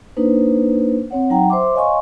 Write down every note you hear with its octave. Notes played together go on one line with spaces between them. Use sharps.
A#3 D4 D#4 B4 C5
C4 C#5 F#5
F#3 D#4 F#5 G5 A#5
C5 E5 C6 D6
C#5 D#5 F5 G#5 C6 C#6